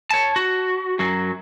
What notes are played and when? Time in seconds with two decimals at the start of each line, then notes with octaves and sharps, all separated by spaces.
0.11 C#5 A5
0.36 F#4
0.99 F#2 F#3